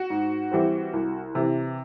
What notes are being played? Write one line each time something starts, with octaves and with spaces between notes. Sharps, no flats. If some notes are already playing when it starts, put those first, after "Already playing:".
Already playing: F#4
G#2
E3 G3 C4
C2
C3 E3